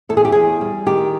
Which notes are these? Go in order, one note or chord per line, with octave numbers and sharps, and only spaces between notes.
E2 A4
G#4
G4
E2 G#4
G3
D#3 G4